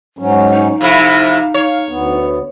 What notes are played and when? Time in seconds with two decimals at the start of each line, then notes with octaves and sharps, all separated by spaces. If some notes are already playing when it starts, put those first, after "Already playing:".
0.19 G#2 F#3 C#4
0.53 D#4
0.81 F2 C3 E4 F5
1.54 C#5 F5
1.89 D2 B3